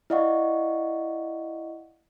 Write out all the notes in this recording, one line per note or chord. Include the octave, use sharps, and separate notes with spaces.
E4 D5 D#5 F5 F#5 C#6